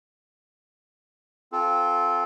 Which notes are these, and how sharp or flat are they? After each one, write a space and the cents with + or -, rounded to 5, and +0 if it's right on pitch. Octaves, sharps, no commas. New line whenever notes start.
C4 +0 F4 +0 A4 -20